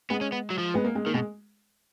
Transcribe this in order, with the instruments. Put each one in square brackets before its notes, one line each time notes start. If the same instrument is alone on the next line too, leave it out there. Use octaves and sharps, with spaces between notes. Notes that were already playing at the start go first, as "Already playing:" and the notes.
[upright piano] G#3 [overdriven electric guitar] B3
[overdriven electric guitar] C#4
B3
F#3
F3
[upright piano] G#3 B3
A#3
G#3
[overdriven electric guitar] D#3 [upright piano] A#3
[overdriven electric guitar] B2 [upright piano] G#3